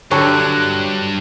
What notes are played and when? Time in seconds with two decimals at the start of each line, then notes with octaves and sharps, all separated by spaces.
0.11 G2 D3 F#3 G4 A4 C#5 F#6